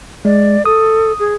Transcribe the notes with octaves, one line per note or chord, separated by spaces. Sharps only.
G#3 D5
A4 D#6
G#4